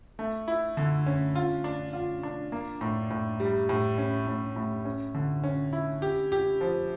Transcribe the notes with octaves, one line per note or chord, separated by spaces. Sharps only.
A3
E4
D3
C#4
F4
D4
F4
D4
A#3
A2
A2
G3
A2
C#4
A2
A2
C#4
D3
C#4
E4
G4
G4
F3